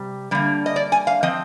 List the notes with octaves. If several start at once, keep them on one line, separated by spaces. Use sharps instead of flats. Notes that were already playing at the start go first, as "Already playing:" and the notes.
Already playing: C3 G3
D3 G3 A#3
D#5
D5
G#5
F5
F3 C4 D#5